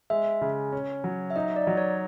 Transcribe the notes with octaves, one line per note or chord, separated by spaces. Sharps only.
G#3 E5
C#3
C#4
F#3
E5
D#4 D#5
D5
F#3
C#5